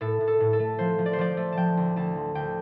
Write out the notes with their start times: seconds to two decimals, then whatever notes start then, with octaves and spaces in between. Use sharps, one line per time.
0.01 A2 A4
0.21 A2
0.28 A4
0.40 A2
0.53 A4
0.59 A3
0.79 F3 C5
0.98 F3
1.06 D5
1.13 C5
1.18 F3 D5
1.37 A3
1.52 F3 G5 A5
1.77 D2
1.96 D2 A5
2.16 F3
2.35 D2 G5